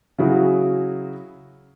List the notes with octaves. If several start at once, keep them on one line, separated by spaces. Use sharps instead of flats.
C#3 F#3 E4 F#4 G#4